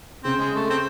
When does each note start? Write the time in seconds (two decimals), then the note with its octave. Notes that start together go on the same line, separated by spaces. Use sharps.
0.24 C#3 C4
0.39 G#3
0.55 A3
0.70 C4